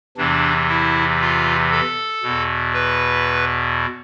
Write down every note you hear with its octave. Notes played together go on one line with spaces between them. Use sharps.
E2 C3 E3 D4
E4
F4
A4
E2 B2
B4